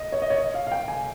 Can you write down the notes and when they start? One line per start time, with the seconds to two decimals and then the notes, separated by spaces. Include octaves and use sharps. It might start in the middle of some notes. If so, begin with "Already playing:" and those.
Already playing: D#5
0.12 C#5
0.22 D#5
0.30 C#5
0.38 D#5
0.54 F5
0.67 F5
0.72 G5
0.88 G#5